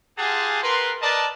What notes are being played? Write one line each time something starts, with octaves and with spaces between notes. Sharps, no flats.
F4 G4 G#4 F#5 G#5 A5
A#4 B4 C6
A#4 B4 D5 D#5 A5